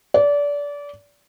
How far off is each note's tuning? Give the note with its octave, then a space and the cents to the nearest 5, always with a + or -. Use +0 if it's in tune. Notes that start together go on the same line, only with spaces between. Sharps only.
D5 -25